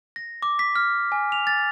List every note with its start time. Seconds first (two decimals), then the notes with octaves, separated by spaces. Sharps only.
0.16 A#6
0.42 D6
0.59 B6
0.76 F6
1.12 G#5
1.32 F7
1.47 A6